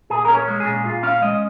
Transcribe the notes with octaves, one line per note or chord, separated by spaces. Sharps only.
A#2 G#4
C#4 A#4
C#5
G#3
G#4
A#2
A#2 F4
C#4 F5
G#3 D#5